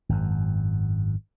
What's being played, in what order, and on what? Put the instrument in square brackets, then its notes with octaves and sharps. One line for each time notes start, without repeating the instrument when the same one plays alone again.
[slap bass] G#1 F#2